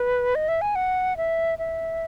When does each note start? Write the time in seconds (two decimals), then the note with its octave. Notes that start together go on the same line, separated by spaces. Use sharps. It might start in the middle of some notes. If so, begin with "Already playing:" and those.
Already playing: B4
0.35 D#5
0.48 E5
0.61 G#5
0.75 F#5
1.17 E5
1.59 E5